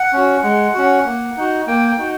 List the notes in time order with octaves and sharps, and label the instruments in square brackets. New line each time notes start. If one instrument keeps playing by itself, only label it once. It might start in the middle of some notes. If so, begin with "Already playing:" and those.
Already playing: [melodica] F#5
C#4 F#4
G#3
C#4 F#4
A#3
D#4 F#4
A#3 G5
G5
D#4 F#4